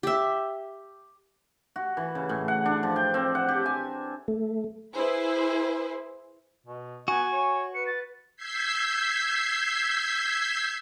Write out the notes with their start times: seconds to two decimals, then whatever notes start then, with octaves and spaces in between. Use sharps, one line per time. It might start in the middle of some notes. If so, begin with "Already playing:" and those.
0.03 G4 E5
1.76 F#4
1.97 E3
2.15 C#3
2.29 A2
2.48 F#5
2.66 D4
2.83 F3
2.96 G5
3.14 C4
3.35 F#5
3.49 G4
3.66 G#5
4.28 A3
4.95 E4 G#4 B4 C5
6.66 B2
7.08 B3 F#4 G#5
7.33 C#5
7.75 B4 C#7
7.87 A6
8.36 E6 G6 G#6 B6 C7